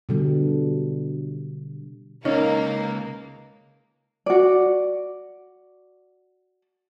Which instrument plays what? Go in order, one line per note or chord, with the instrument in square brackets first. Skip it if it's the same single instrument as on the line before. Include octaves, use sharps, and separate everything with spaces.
[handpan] B2 D3 G3
[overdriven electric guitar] C#2 [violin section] A#3 [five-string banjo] C#4 [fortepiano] D#4
[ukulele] F#4 D5